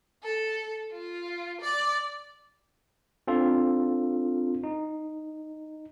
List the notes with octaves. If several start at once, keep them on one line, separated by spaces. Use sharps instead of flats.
A4
F4
D5
C4 D4 F4 A4
D#4